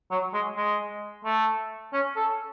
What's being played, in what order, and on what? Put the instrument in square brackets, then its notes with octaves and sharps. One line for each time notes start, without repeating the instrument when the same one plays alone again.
[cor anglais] F#3
G#3
G#3
A3
C#4
A4